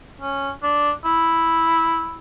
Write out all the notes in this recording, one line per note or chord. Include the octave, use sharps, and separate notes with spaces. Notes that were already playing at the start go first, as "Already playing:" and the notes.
C#4
D4
E4